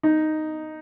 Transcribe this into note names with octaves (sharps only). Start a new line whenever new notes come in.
D#4